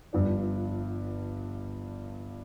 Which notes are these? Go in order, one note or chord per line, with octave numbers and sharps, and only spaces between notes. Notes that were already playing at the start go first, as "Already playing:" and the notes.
G1 G2 F3 D4